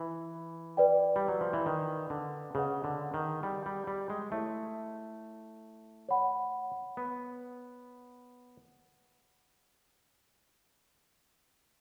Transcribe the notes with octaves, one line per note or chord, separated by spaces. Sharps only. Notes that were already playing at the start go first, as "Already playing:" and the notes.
Already playing: E3
B4 D5 G5
G3
F#3
F3
E3
D#3
D3
C#3 G#4 B4 D#5 F#5
D3
D#3
G3
G3
G3
G#3
A3 E4 A4 C#5
C#5 F#5 B5
B3